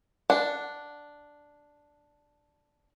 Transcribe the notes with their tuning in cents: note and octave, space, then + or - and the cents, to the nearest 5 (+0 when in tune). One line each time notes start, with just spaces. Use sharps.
D4 +0 F#5 +0